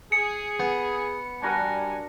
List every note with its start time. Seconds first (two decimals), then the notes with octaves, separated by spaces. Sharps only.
0.12 G#4 C#7
0.60 B3
1.42 G3 D4 F#4 A#4 G#5